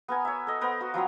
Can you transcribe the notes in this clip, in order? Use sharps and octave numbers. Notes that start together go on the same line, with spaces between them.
B3 A#4 G#5
C#5 E5
A4 D#5
B3 A#4 C5
F#4 B4
F3 F#3 C4 A#5